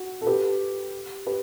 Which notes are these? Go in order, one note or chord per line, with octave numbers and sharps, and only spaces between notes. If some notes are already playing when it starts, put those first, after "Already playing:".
Already playing: F#4
A4
G4 B4
G4 B4